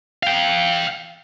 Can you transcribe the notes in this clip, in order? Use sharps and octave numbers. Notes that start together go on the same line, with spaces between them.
F5 G5